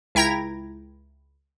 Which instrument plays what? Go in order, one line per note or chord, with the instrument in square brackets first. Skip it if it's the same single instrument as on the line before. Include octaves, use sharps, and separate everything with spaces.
[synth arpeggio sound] C#2 E4 G5 A#5 G#6 A#6